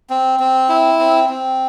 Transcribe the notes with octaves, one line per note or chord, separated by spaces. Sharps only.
C4
C4
E4
C4
C4